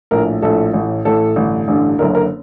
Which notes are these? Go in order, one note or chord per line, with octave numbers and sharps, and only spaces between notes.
A#1 A2 A#4
A#1 A2 A4
A1 A2
A1 A2 A4
A1 G2 D3
A1 G2 D3
F#1 F#2 D3 A#4
A#4